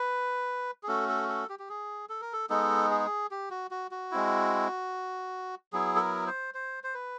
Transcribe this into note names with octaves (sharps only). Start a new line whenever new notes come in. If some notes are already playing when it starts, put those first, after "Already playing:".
Already playing: B4
G#4
A3 C#4 F#4 A4
A4
A4
G4
G4
G#4
A4
A#4
A4
G#3 B3 D#4 A4
G#4
G4
F#4
F#4
F#4
G#3 C4 E4
F#3 B3 E4 G#4
A4
A#4
C5
C5
C5
B4